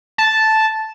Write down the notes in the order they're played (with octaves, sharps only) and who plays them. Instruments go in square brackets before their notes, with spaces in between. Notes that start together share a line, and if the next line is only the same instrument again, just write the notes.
[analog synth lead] A5